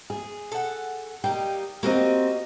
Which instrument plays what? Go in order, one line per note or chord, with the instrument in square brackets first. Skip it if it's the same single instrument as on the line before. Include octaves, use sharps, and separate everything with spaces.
[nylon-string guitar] G#4
[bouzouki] A4 F#5
[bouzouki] G3 A#3 D#4 [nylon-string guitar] G5
[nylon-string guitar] A#3 C4 [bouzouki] F#4 G4 D#5